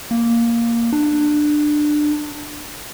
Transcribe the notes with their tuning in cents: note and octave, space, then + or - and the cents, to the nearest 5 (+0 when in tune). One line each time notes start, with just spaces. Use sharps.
A#3 +0
D4 +20